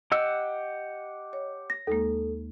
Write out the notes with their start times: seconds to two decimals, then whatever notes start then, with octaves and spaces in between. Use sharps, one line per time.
0.12 G4 D#5 F#5 E6
1.33 C#5
1.70 A#6
1.87 D#2 G#3 A#3 A4